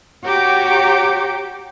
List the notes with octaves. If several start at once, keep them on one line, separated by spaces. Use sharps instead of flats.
F#4 G4 C#5 G5 A#5 D6